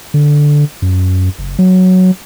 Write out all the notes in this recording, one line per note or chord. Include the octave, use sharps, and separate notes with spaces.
D3
F#2
F#1
F#3